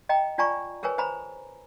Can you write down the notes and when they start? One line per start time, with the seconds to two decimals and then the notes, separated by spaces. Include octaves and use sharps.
0.09 D#5 G5 A#5
0.38 F4 D5 G#5 A#5 C#6
0.83 G#4 A#4 B4 C#5 G#5
0.98 C5 G#5 A#5 B5